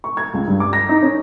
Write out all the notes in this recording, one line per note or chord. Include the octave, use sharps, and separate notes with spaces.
C#6
G#6
C#2
G2
D6
A#6
D#4
C#4